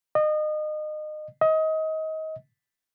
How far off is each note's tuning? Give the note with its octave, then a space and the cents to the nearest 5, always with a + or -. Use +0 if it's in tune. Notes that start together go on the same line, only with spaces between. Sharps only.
D#5 -30
D#5 +25